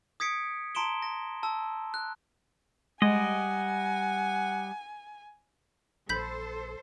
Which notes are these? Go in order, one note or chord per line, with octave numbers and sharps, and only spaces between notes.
D#6 G#6 B6 C#7 D7
A5 A#5 C6 D7 E7 G7
A#6
A5 E6
F#6
G3 G#3 D#5 F#5 G#5
A#1 A4 C5 B5 G6 B6